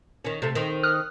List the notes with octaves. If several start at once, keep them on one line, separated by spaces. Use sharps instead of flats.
D#3 C#4
C3 A3
D#3 C4
D#6 F6 F#6